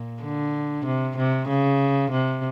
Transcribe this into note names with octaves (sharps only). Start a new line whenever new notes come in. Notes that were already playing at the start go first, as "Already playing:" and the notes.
Already playing: A#2
D3
C3
C3
C#3
C3